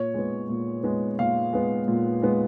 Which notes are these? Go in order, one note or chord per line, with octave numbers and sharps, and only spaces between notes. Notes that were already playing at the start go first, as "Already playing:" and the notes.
Already playing: A#2 C#5
G#3 B3
A#2
G#3 B3
A#2 F5
G#3 B3
A#2
G#3 B3